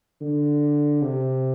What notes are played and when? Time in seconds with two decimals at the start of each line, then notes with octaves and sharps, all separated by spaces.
0.21 D3
1.02 C3